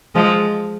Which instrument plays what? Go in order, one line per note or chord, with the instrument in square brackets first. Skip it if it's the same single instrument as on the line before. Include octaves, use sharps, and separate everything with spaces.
[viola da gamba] F3 G#3